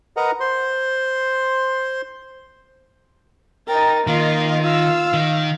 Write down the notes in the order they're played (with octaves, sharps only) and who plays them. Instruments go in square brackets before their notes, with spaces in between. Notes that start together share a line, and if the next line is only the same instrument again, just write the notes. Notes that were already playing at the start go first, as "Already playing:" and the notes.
[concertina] A#4 B4 D#5 F#5 A#5
C5 C6
[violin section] D#4 A6 [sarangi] A#4 [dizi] G5
[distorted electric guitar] D#3 [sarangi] A#3 [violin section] F4 D#5 [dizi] F5
[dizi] F4 [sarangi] F5 [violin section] E6
[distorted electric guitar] D#3